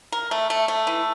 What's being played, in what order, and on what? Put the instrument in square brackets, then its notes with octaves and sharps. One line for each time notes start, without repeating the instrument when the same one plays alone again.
[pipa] A#4
A3
A3
A3
E3